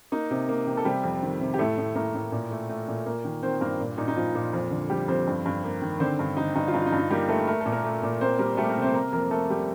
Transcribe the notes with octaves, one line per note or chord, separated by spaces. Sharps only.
A#3 D#4
C3
A#3
C3
A4
C3 G3 G4
F2
D#3
C3
G4
A2 A3 A4
A2
A2 A#3 A#4
A2
A#2
A3
A3
A#2
A#3
D#3
D#3 C4 C5
G2 A#3 A#4
A#2
A#2 D#4
D#4
A#2 F3 F4
A#2
F2
D3
F2 G3 G4
F2 C4 C5
G2
G2
A#3
D#3
D3 C4 C5
G2
D3 D#4
G2 D#4
F4
G2 D#4
F4
D#4
G2
D#4
G3 A#3 G4
A3 A#3 A4
A3 A#4
A4
A#2
A#3 A#4
A3
A#2
A#3 C4 C5
G3 A#3 A#4
G3 A3 A4
A#3 A#4
C3
C4 C5
A#3 A#4
F2 A#3 A#4
A3 A#3 A4
G3